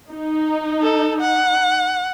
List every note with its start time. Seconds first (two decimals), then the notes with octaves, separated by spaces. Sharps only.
0.11 D#4
0.83 A4
1.20 F#5